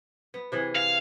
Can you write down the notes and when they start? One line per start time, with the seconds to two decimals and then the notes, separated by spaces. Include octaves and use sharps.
0.34 B3
0.52 C3 E3 G#4
0.75 F5